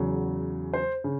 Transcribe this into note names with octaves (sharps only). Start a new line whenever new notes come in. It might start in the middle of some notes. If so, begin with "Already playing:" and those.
Already playing: E2 C#3 F#3
C5
C#3